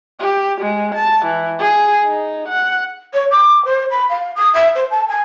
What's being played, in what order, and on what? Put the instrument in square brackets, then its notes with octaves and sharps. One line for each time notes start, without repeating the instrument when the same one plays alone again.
[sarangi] G4
G#3
A5
E3
G#4
D#4
F#5
[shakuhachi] C#5
D6
C5
B5
F5
D#6
E5
C5
A5
G#5